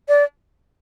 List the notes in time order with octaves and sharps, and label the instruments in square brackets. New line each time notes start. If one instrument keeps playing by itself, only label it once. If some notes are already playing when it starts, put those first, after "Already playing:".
[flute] D5